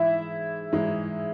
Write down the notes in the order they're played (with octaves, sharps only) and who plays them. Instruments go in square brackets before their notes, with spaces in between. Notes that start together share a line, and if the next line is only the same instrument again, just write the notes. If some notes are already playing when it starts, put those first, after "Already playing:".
Already playing: [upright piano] G#2 E3 G#3 [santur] E4 E5
[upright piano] G#2 E3 G#3 D#4